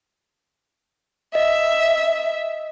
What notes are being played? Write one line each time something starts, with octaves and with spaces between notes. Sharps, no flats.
D#5 E5